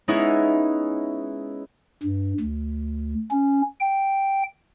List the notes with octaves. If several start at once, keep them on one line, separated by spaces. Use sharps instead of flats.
G#3 B3 C#4 D#4 E4
G2
D2
C#4
G5